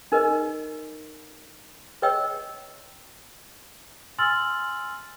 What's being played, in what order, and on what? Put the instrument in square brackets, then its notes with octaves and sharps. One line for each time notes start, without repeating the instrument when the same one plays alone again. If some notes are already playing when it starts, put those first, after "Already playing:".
[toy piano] D#4 A#4 B4 D#5
B4 C#5 D#5 G5 E6
[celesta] G#5 C6 E6 F6 A6 F#7